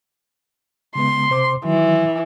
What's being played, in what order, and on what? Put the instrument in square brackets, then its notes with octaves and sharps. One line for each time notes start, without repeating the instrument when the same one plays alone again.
[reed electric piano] C#3 G#3 B3 [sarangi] C6
[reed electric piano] C3 C5 D6
[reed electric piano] D#3 F#3 [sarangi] E3